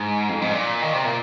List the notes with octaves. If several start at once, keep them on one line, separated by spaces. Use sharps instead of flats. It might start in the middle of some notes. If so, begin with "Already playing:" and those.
Already playing: G#2
F2
G#2
A#2
D#3
C3
A#2